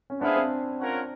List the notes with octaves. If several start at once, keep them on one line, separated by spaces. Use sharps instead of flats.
C#4
B3 D4 E4 G#4 C5 F5
C4
C#4 F4 A#4 C#5 F#5